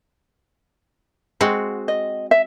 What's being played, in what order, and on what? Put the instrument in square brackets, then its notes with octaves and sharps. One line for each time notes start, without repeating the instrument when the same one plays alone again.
[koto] G#3 C4 F#4
[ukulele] D#5
E5